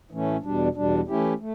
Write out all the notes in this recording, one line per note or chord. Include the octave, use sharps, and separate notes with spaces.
A2 E3 A3 C#4
E2 B2 G3 D4
E2 B2 G3 D4
E3 A3 C#4 E4 G4
A3